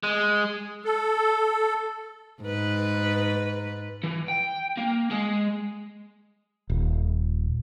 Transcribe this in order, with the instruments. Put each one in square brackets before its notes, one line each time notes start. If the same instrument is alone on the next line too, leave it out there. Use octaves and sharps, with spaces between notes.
[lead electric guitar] G#3
[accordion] A4
[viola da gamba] G#2 B4
[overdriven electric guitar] E3
G5
A#3
G#3
[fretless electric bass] D#1